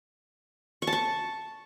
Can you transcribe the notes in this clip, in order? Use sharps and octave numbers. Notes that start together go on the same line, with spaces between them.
C#6
A5
C#6